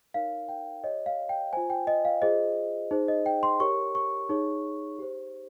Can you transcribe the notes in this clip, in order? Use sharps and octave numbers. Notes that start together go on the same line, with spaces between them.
D#4 A#4 C#5 F5
G5
G4 C#5 D#5
F5
G5
F4 C5 G#5
G5
D#5
F5
F4 G#4 C5 D#5
D#4 G#4 C5
D#5
G5
C6
G4 A#4 C#5 C#6
C#6
D#4 G#4 C#5
G4 C5